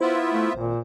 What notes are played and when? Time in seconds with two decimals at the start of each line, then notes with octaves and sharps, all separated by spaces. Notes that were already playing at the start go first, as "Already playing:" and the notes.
0.01 B3 E4 F4 C5 E5
0.32 A3
0.55 G#1 A#2